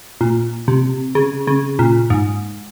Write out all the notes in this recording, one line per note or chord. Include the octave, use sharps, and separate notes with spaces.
A#2
C3
C#3
C#3
A#2
G#2